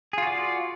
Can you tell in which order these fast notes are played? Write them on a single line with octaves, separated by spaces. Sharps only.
G#4 F4 F#4 D5